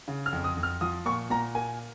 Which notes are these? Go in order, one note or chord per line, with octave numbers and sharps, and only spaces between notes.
C#3
F6
F2
D#6
F2
F6
F3 D#6
A#2 C#6
A#2 A#5
A#3 G#5